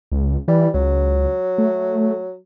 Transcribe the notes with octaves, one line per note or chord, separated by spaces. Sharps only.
C#2
E3 G3
C#2 F#3
A3